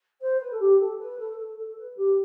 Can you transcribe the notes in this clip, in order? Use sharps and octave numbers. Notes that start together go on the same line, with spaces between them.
C5
B4
A4
G4
A4
B4
A4
A4
A4
B4
G4